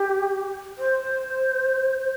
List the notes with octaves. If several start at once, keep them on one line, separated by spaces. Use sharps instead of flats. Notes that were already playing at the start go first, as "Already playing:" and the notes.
Already playing: G4
C5